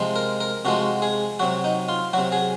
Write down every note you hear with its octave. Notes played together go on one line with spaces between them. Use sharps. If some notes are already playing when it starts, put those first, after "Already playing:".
Already playing: C3 F3 G#3
A#4
A#4
C3 F3 G#3 F#4
G#4
C3 F#3 F#4
D#4
F4
C3 F#3 F#4
G#4